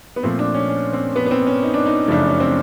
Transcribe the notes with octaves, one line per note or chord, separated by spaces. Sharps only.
B3
A#2 F3 A3 C4
D4
C#4
C#4
C4
B3
B3
C4
C#4
D#4
D4
D#4
F#2 C#3 F3 A3 D4
C#4
C4